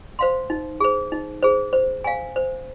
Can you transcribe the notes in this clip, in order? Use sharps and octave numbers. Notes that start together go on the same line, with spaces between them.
C5 F5 C6
D#4
G#4 C5
D#4
G#4 C5
C5
F5 G#5
C5